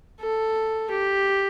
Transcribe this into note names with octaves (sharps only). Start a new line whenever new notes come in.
A4
G4